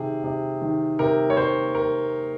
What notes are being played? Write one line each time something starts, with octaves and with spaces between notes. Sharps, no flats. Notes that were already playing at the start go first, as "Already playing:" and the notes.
Already playing: C3 D#3 G#4
C3
D#3
C3 A#4
C#5
C3 C5
A#4